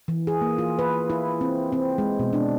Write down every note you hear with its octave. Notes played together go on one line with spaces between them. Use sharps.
E3
G#4
A#3
F4
B4
E4
C4
C4
G#3
B2
D4